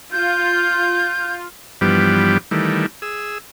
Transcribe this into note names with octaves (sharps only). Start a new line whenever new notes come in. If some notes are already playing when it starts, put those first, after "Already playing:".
F4 G6
G2 E3 F3 G3 B3 G4
D#3 E3 G3 A3
G#4 E6